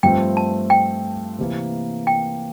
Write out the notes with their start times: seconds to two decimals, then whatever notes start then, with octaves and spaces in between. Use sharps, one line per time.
0.03 G2 F3 A3 C4 G5
0.37 A5
0.70 G5
1.38 C3 E3 A#3 E4
2.07 G5